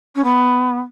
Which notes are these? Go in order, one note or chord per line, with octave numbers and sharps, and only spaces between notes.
C#4
B3